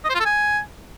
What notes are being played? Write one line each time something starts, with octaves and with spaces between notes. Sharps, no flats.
D#5
C5
F4
A4
G#5